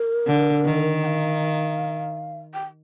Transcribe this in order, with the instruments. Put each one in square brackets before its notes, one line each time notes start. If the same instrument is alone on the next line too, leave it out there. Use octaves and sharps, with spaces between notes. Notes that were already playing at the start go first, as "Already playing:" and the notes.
Already playing: [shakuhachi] A#4
[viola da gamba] D3
D#3
[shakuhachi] G5
F5
G5